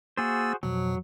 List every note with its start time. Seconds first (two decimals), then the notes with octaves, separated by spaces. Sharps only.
0.17 A#3 F#4 G#4 C5 E6 A6
0.63 F2 B2 F3 F#3